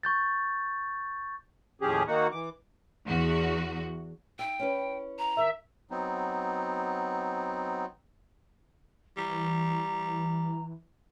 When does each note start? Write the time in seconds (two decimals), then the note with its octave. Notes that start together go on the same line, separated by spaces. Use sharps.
0.03 C#6 G6 A6
1.82 D#2 A2 F3 C#4 G4 G#4
2.07 D#3 A#3 D#4 F#4 F#5
2.32 E3 D6
3.06 E2 F#4
4.39 D#4 E5 G5
4.59 C#4 E4 B4
5.19 A#5
5.37 D#3 A#4 E5
5.91 F#3 B3 C4 D#4
9.17 E3 G3 A#5